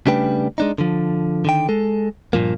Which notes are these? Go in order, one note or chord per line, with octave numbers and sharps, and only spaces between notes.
C#3 G3 A3 D4 B4 G5
G#3 D4 D#4
D3 F3
D3 D#3 G5
G#3 A4
G2 A#2 F3 A#3